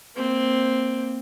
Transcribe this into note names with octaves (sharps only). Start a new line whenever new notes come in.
A#3 C4